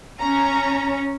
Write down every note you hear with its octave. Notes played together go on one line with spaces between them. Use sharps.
C#4 A#5